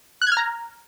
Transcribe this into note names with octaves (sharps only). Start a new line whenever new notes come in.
F#6
G#6
F6
A#5